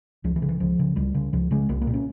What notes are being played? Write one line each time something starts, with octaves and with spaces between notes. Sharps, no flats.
C#2 F3
E3
C#3
E3
C#2 F3
C#3
C#2 G3
C#3
C#2 F3
C#3 G#3
C2 A#3
A#3
A#2
C#4